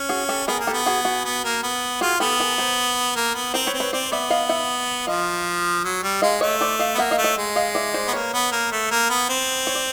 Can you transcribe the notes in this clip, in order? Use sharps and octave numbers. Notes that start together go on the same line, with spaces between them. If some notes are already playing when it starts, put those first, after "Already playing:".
Already playing: C#4
F#4 G#4
G4 A4
B3 G#4 A#4
A#3
G4 A4
B3
F#4 G#4
F#4 G#4
B3
A#3
B3
F4 F#4 G#4
B3 G4 A4
G#4 A#4
A#4 C5
A#3
B3
C4 A#4 C5
B4 C#5
C4
B4 C#5
C4 C5 D5
B3 D5 E5
D#5 F5
E5 F#5
F3 D#5 F5
F#3
G3
G#3 D#5 F5
A3 C#5 D#5
C5 D5
D#5 F5
B3
A#3 E5 F#5
D#5 F5
A3
C#5 D#5
G#3
D#5 F5
D5 E5
C5 D5
B3
A#3 B4 C#5
B3
A#3
A3
A#3
B3
C4
C#5
D5